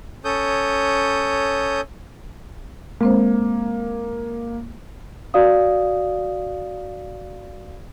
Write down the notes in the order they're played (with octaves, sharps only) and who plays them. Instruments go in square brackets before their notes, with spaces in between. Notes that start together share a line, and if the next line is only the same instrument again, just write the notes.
[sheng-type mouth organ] C#4 A4 C#5 D#6 G6
[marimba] G#3 C4 C5 [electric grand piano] A#3
[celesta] F#4 D5 F5 D#6